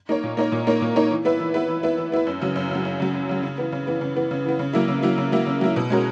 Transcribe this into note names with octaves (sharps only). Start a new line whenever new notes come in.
A#3 D#4 A#4 C#5
A#2
A#3 D#4 A#4 C#5
A#2
A#3 D#4 A#4 C#5
A#2
A#3 D#4 A#4 C#5
E3
B3 E4 B4
E3
B3 E4 B4
E3
B3 E4 B4
E3
B3 E4 B4
F#2
C#3 F#3
F#2
C#3 F#3
F#2
C#3 F#3
F#2
C#3 F#3
C#3
E3 B3
C#3
E3 B3
C#3
E3 B3
C#3
E3 B3
C#3
F#3 A#3 E4
C#3
F#3 A#3 E4
C#3
F#3 A#3 E4
C#3
F#3 A#3 E4
B2
G#3 C#4 F#4 A#4